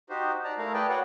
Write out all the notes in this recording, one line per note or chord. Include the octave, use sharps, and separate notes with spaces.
D#4 F#4 G4 C5
D5 A5 A#5
A3 E4 A#4 F5 A#5
G#4 B4 D5 G5 A5
F#4 B4 C#5 D5 F#5 G5